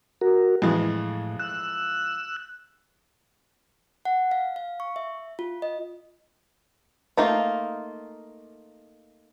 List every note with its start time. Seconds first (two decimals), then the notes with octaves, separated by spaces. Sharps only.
0.21 F#4 A#4
0.62 F2 A2 E3 G#3
1.39 E6 F#6
4.05 F#5
4.31 F5
4.56 F5
4.80 C#6
4.96 E5
5.39 F4
5.62 D#5
7.17 A3 A#3 D#4 F4